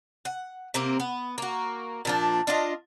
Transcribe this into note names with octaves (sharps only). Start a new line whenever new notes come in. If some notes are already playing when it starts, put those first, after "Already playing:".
F#5
C3 A#3 C4
B3
A#3 F#4
A#2 F3 D4
D4 F4 D#5